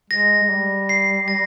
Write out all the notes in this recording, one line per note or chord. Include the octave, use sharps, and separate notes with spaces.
G#3 A#6
G#3
G3
C7
A#6